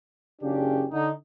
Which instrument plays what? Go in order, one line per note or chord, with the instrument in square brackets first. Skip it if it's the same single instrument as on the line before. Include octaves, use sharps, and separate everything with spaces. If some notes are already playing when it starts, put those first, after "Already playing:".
[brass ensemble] F#1 C#3 C#4 D4 G4
D3 D#4